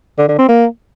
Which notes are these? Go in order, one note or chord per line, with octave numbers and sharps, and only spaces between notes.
D3
D3
C4
A#3